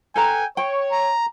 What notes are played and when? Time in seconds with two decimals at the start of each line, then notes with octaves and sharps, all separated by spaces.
0.16 A4 B4 G5 G#5 A#5
0.57 C#5 G5
0.92 A#5